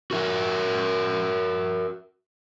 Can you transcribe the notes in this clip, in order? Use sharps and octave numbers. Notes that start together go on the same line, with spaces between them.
F#4 A#4 E5